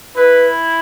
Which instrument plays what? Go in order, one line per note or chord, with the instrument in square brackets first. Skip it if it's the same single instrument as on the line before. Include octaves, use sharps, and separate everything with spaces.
[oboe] E4 [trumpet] B4